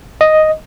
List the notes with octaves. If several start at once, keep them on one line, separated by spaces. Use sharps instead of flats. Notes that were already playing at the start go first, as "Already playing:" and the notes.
D#5